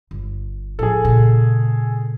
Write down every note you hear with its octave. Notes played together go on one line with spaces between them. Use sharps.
G1
A2 F3 G#4 A4
A#2 C#3